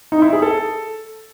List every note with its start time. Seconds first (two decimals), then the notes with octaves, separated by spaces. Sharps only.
0.12 D#4
0.22 E4
0.33 G#4
0.42 A4